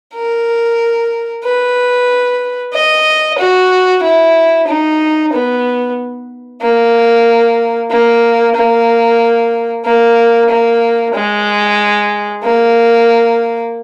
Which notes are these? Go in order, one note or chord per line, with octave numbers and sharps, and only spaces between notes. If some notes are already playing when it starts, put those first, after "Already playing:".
A#4
B4
D#5
F#4
E4
D#4
B3
A#3
A#3
A#3
A#3
A#3
G#3
A#3